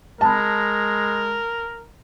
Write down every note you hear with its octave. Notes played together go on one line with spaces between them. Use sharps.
G#3 A#4 A5 B5